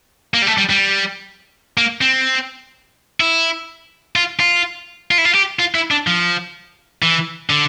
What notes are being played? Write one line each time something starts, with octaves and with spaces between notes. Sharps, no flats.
A#3
G3
A3
G3
G3
A#3
C4
E4
F4
F4
F4
E4
F4
G4
F4
E4
D4
F3
E3
D3